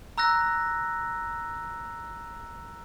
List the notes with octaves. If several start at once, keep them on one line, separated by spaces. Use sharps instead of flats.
A#5 E6 F#6 A#6